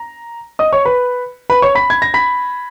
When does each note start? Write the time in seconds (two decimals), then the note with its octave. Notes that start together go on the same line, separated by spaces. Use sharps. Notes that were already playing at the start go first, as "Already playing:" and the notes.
Already playing: A#5
0.59 D#5 D#6
0.73 C#5 C#6
0.85 B4 B5
1.50 B4 B5
1.62 C#5 C#6
1.75 B5 B6
1.90 G#6
2.02 A#6
2.14 B5 B6